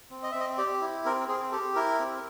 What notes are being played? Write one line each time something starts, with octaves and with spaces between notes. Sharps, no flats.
C4
D#5
C4 E5
D#5
G4 D5
E4
C4 A#4
C4 G#4
G4 A4
E4 A#4
C4